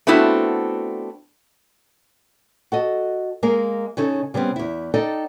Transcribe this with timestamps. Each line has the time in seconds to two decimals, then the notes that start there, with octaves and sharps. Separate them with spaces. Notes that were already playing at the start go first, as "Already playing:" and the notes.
0.07 A3 B3 C4 D4 E4 F#4
2.72 F#4 A4 D#5
3.43 G#3 A#3 A#4 F5
3.97 C#3 C#4 D#4 A4
4.34 C#3 G3 B3 C4
4.56 E2 E4
4.94 D#4 A4 D5 D#5 G5